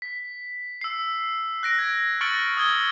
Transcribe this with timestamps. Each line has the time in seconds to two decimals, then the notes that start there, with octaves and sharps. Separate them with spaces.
0.02 B6
0.81 E6 C7
1.63 F#6 A#6 D7
1.78 G#6
2.21 C#6 F6 A6 C#7 D7 F#7
2.57 D#6 E6 G#6 G7